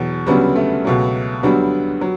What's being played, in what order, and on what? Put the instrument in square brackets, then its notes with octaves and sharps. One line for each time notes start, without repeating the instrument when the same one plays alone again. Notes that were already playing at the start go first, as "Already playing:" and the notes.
Already playing: [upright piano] E2 B2 F#3
D2 C#3 F#3 G3 B3
A3
C#2 B2 F#3
D2 D3 F#3 G3 B3
F#3